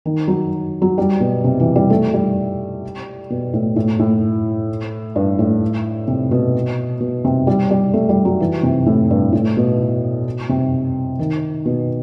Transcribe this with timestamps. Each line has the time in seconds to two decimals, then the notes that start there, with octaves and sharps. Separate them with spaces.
0.05 D#3
0.27 F#3
0.82 F#3
0.98 G3
1.20 B2
1.44 C3
1.60 E3
1.75 G3
1.90 A3
2.14 G3
3.30 B2
3.54 A2
3.76 A2
3.99 A2
5.16 G2
5.39 A2
6.08 C3
6.31 B2
7.00 B2
7.25 C3
7.47 G3
7.71 G3
7.94 A3
8.09 G3
8.25 F#3
8.40 E3
8.63 C3
8.86 A2
9.10 G2
9.32 A2
9.57 B2
10.49 C3
11.19 D#3
11.65 B2